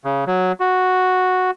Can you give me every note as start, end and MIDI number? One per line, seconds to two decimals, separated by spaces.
0.05 0.24 49
0.27 0.52 54
0.60 1.51 66